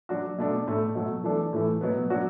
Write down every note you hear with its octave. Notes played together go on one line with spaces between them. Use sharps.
F#3 D4 F#4
B2 A3 D4
A2 A3 D4
B2 F#3 A3
E3 A3 D4 A4
A2 E3 A3
B2 F#3 B3
F#3 D4 F#4